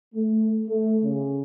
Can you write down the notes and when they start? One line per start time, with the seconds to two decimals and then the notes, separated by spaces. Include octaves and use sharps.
0.15 A3
0.68 A3
1.04 C#3